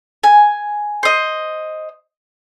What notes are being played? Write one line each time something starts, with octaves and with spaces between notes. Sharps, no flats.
G#5
C5 D#5